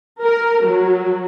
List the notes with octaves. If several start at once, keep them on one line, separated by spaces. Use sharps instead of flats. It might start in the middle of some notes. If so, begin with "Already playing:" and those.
A#4
F#3